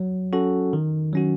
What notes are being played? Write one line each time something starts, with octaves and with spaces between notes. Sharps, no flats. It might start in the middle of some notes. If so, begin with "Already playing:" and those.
Already playing: F#3
C#4 F#4 A4
D#3
F#3 C#4 F#4